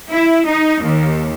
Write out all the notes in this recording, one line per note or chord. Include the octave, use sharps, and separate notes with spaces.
E4
D#4
D#2